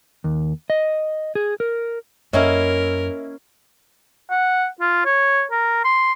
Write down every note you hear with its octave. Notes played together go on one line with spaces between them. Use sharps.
D#2
D#5
G#4
A#4
F#2 A#3 C#4 E4 A#4 C#5 D#5 E5
F#5
F4
C#5
A#4
C6